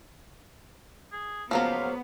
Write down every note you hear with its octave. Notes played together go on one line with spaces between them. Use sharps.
G#4
C#2 F3 F#3 A#3 B3 C5 C#5 F5